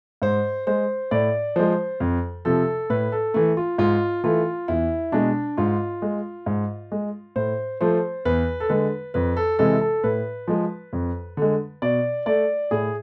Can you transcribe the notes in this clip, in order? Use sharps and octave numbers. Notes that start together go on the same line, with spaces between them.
G#2 C5
G#3 C5
A2 D5
F3 G#3 C5
F2
C3 F3 A4
A2 B4
A4
E3 A3
F4
G#2 F4
E3 A3 F4
E2 E4
B2 G#3 D4
G#2 F4
G#3
G#2
G#3
A2 C5
F3 A3 C5
E2 B4
A4
D3 G#3 B4
F2 B4
A4
C3 E3 G#3 A4
A4
A2 B4
F3 G#3
F2
D3 G#3
B2 D5
A3 D5
A2 G#4